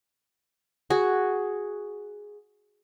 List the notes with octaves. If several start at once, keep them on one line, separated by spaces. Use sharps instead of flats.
F#4 G#4